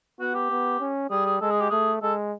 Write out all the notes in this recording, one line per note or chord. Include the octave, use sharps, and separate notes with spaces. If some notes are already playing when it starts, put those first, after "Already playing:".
B3 F#4
G4
B3
C#4
G3 G#4
G#4
G#3 A4
G#4
G4
A3 G#4
G#3 A4